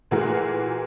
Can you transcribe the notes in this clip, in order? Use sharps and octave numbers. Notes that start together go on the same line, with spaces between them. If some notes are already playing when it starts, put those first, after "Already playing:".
A#2 E3 A3 F#4 G#4 A#4